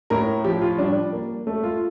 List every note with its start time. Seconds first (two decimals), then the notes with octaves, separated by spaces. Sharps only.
0.10 A2 A#4
0.44 F3 G4
0.61 F4
0.78 G3 D4
1.13 A#3
1.47 A3
1.64 F4